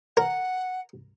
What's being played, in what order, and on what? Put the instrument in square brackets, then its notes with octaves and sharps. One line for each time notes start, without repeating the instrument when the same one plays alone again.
[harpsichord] A#4 [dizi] F#5